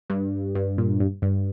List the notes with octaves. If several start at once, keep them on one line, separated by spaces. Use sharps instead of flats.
G2
G2
A#2
G2
G2